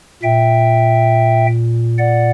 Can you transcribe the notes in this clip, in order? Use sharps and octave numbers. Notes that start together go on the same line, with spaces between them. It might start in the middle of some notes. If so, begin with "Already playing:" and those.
A#2 E5 G5
D5 F#5